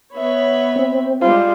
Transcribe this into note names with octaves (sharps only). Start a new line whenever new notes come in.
B3 C#5 E5 B5
C4
G3 G#3 F4